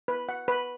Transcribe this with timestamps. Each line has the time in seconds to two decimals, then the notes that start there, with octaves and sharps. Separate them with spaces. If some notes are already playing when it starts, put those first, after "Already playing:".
0.08 B4
0.29 F#5
0.48 B4